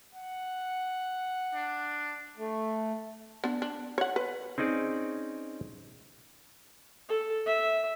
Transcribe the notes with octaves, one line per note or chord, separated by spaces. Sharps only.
F#5
D4
A3
B3 D4
D4
C#5 F#5
B4
C4 C#4 D#4 G#4 D5
A4
E5